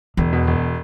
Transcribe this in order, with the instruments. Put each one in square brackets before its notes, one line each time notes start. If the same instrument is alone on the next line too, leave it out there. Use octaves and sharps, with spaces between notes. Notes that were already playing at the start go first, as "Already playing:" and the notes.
[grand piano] E1 [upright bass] E2
[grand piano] B2
E1